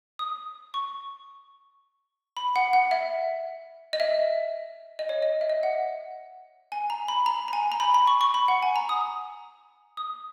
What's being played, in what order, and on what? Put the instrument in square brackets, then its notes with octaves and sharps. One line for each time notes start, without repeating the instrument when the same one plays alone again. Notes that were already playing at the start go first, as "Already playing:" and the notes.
[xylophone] D#6
C#6
B5
F#5
F#5
E5
D#5
E5
D#5
C#5
D#5
E5
D#5
F#5
G#5
A#5
B5
A#5
A#5
G#5
A#5
B5
B5
C#6
C#6
B5
F#5
G#5
A#5
D#6
D#6